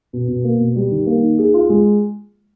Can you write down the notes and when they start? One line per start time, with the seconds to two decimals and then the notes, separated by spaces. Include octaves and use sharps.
0.13 B2
0.28 B2
0.44 A#3
0.60 B2
0.76 G3
0.91 D#3
1.06 A#3
1.22 D#4
1.38 G#4
1.54 F4
1.69 G#3